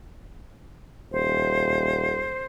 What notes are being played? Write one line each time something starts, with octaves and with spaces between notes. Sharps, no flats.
D#1 C5